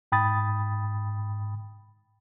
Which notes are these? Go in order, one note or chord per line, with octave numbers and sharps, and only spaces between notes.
G#2 G5 B5 D#6 A6